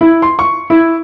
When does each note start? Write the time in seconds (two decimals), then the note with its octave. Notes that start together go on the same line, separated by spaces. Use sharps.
0.01 E4
0.22 C6
0.39 C#6
0.70 E4